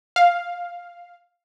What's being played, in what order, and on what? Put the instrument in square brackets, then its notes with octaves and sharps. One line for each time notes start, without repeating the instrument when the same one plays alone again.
[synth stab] F5